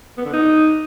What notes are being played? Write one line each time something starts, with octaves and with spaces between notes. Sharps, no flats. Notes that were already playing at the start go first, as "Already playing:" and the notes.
B3
D3
D#4